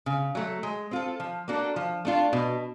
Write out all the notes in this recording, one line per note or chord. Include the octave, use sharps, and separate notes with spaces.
C#3
F#3 A3
G#3
C4 F4 A4
F3
A#3 D4 F#4 A4
F3
A3 D4 F4
B2